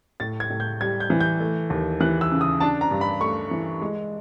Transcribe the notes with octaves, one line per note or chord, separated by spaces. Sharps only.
A2 A6
G#6
A2
G6
G3 G#6
G6
E3
G6
A3
D#2
E3 F#6
E6
C#3
D#6
D4 A5
A#5
G2
B5
A3 C#6
E3
G#3